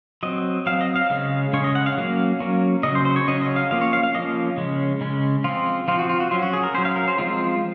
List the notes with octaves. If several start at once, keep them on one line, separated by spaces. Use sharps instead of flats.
F#3 C4 D#5
F#3 C4 F5
D#5
F5
C#3 G#3 C#4 F5
C#3 G#3 C#4 C#5
D#5
F#5
F5
F#3 A#3 C#4
F#3 A#3 C#4
C#3 F#3 C#4 D#5
C5
C5
C#5
C#3 F#3 C#4 D#5
D#5
F5
F3 A#3 C#4 F5
C#5
F5
F5
F3 A#3 C#4 D#5
C#3 G#3 C#4
C#3 G#3 C#4
F3 C4 F4
F3 C4 F4
F#4
F4
F#4
F#3 C#4 F4
F#4
G#4
A#4
F#3 C#4 C5
F5
A#4
C5
F3 G#3 C4 F4